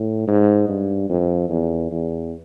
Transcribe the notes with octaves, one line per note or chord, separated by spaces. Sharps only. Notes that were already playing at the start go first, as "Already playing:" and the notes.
Already playing: A2
G#2
G2
F2
E2
E2